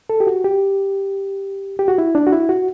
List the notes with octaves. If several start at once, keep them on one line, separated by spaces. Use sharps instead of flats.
A4
G4
F#4
G4
G4
F#4
E4
D4
F#4
E4
F#4